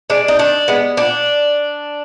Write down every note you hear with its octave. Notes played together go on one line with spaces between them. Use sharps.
G#3 D4
D#4
D#3 D4
G#3 B3
A#2 D4